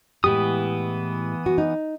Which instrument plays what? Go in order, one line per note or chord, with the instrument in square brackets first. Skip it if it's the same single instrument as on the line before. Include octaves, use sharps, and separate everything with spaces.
[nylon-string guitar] A2 G#3 G4 [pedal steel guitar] E3 B3 D#6
[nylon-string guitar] F#4
D#4